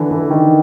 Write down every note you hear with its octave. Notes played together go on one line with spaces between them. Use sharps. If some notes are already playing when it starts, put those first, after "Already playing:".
Already playing: D3 E3
D3 E3
D#3